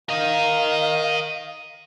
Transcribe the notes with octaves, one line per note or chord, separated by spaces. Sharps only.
A#4 D#5 F5